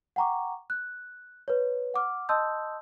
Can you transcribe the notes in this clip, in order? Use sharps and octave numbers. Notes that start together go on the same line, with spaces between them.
F#5 G5 A#5 C#6 D6
F#6
B4 C#5
F#5 D6 F6
D#5 A5 C6 D#6 E6 G6